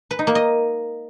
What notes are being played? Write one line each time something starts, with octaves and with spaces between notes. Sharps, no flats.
B4
D#4
A#3
D#5